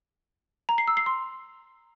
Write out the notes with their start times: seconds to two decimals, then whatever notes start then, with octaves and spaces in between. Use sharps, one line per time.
0.69 A#5
0.78 C7
0.88 E6
0.97 C7
1.06 C6